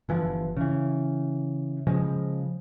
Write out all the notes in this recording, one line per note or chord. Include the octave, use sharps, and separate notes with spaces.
G1 E3 F3
C#3 E3
C#3 F3 G#3